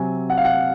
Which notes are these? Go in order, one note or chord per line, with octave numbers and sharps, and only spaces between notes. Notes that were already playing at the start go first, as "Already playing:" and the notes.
Already playing: C3 F#3 C4 G#5
F#5
F5
F#5